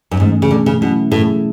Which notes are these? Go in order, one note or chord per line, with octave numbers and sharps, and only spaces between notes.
F#2
G#2 E3 A3 C#4
C#3
B2 D3 A3 C#4
C#3
B2 F#3 A3 C#4 E4
A2 A3 E4 G#4